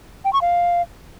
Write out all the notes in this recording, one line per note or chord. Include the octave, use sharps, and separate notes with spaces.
G5
C#6
F5